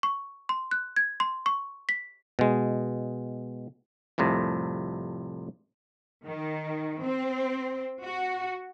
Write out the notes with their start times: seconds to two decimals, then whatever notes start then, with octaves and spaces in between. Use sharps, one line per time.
0.03 C#6
0.49 C6
0.71 F#6
0.96 G#6
1.20 C6
1.46 C#6
1.89 B6
2.39 B2 G#3
4.18 C2 F2 A2 C3
6.26 D#3
7.01 C4
8.03 F#4